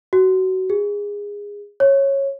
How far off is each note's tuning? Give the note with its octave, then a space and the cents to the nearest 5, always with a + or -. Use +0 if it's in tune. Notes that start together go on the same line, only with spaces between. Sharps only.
F#4 +20
G#4 -20
C#5 -15